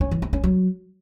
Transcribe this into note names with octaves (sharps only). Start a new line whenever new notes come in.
C#4
E3
C4
C#4
F#3